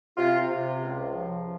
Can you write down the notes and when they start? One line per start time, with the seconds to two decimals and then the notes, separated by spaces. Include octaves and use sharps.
0.16 C3 F4
0.48 C3
0.80 C#2
1.12 F3